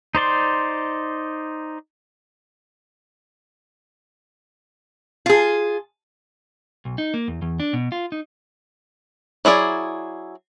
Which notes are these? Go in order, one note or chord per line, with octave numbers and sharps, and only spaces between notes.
D#4 C5 D5 C6
F4 G#4
B1
D#4
A#3
E2
E2
D4
B2
F4
D#4
F#3 E4 G#4 D5